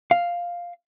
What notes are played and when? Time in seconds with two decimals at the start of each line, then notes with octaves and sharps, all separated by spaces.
0.11 F5